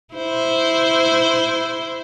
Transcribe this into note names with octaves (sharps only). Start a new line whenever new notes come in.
E4 C5